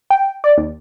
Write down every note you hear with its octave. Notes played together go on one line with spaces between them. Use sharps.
G5
D5
D#2